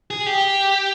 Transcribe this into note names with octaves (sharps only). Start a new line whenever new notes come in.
G#4
G4